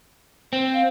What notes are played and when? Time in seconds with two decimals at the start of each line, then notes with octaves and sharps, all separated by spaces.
0.53 C4
0.74 F5